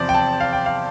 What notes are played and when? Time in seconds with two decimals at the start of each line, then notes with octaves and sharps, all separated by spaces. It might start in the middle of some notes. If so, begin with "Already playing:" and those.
Already playing: E2 C3 F3 C5 D5
0.09 G5
0.14 A5
0.40 F5
0.53 G5
0.66 F5